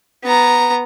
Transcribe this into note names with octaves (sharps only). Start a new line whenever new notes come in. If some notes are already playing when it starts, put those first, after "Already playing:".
B3 A#5